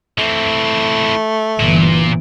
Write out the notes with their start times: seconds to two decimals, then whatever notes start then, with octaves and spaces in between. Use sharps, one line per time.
0.18 E3 A3 C4
1.60 G1 A#2 E3